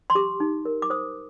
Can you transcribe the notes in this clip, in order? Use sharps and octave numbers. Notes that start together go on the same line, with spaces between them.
C6
G4 D6
D#4
A#4
D6
C5 D#6